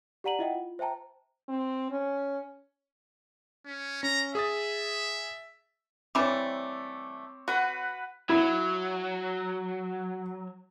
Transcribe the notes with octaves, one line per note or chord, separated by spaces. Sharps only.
G4 D5 F#5 A#5 D#7 F#7
E4 F4 D#5 E5 F#5 G5
F4
C5 E5 G5 A5 A#5
C4
C#4
C#4
C#4 A#5
G#4 E5 D#6 A6
E3 G3 A3 C4 C#5 D6
F#4 B4 F#5 B5
F#3 E4